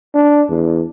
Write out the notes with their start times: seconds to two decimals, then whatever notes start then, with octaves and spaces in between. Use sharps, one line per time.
0.15 D4
0.50 E2